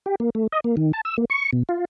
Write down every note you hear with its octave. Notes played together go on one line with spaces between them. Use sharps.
G4
A#3
A3
D#5
A#3
D#3
A5
E6
A#3
C#6
B2
F4